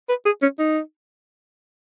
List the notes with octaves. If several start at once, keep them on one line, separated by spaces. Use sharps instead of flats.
B4
G#4
C#4
D#4